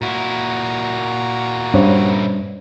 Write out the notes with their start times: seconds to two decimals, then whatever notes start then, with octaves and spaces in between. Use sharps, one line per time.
0.02 A#2 E4 F#4 A#5
1.74 G2 C#4 C5 C#5